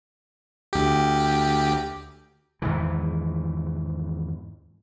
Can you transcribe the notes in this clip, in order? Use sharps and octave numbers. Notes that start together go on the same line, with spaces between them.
D2 G4
E2 G#2 D#3 E3